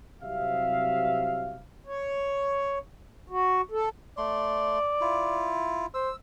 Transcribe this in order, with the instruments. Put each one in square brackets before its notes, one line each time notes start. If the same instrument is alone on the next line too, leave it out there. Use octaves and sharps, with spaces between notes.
[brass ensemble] C2 C3 F#3 E5 F5
[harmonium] C#5
F#4
A4
[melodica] A3 C6 [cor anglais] D5
[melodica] E4 F4
[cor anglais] C5 [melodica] E6